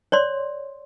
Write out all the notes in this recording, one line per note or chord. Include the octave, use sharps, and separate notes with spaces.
C#5 D5 C6